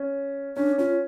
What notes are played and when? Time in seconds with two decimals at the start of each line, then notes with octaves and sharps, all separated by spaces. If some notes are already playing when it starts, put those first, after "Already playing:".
Already playing: C#4
0.56 C#4 D4
0.78 C#4 F4